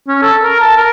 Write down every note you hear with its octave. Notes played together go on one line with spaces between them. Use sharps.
C#4
A4
A#4
A5
A#4